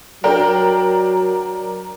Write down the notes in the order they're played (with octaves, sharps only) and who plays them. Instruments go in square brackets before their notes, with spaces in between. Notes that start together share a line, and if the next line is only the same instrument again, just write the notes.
[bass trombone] F#3 [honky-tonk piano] D4 A#4 G5